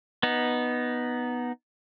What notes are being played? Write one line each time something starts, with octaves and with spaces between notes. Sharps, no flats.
B3 D#4